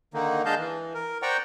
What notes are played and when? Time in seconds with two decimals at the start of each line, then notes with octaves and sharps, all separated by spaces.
0.14 D3 D#3 A#3 D#4
0.45 G#3 D4 D#5 F5 A5 G6
0.58 E3
0.94 A#4
1.22 C5 D5 F#5 G5 A#5 C#6